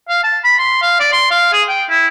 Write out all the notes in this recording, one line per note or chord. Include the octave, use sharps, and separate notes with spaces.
F5
A5
B5
C6
F5
D5
C6
F5
G#4
G5
E4